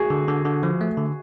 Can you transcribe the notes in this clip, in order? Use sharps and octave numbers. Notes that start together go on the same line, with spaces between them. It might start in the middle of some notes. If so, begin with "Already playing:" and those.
Already playing: F#4 G#4
D3
D3
D3
F3
A3
D3